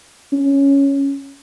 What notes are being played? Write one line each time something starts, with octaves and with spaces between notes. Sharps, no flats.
C#4